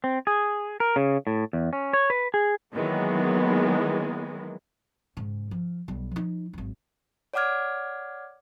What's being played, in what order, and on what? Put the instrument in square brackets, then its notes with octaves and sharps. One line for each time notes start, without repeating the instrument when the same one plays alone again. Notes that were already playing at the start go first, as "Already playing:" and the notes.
[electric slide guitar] C4
G#4
A#4
C#3
A2
E2
C#4
C#5
B4
G#4
[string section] D#3 E3 F#3 G#3 A#3 B3
[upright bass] G#2 C#3
F3
B1 G3
F3 D#4
G#1 F#2
[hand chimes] C#5 D5 F#5 D6 F6 G#6